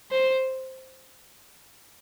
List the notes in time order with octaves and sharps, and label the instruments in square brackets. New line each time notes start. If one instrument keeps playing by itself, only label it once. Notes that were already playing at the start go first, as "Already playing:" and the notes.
[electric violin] C5